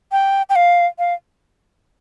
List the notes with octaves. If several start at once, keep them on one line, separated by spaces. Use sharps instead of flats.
G5
G5
F5
F5